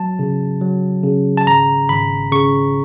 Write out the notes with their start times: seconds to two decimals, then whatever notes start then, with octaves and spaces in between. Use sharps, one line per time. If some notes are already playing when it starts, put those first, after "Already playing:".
Already playing: F#3 A5
0.19 C#3
0.61 F#3
1.03 C#3
1.37 A5
1.46 G#1 A#5
1.89 G#1 B5
2.32 C#3 C#6